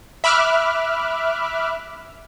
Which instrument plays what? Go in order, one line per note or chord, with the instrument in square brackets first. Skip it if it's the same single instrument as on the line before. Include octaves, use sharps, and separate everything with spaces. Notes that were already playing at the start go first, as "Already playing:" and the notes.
[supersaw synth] E5 B5 D6 F6 F#6